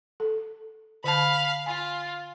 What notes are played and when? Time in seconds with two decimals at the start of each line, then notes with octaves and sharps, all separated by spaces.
0.20 A4
1.04 D3 F5 A5 B5
1.66 F4 G#5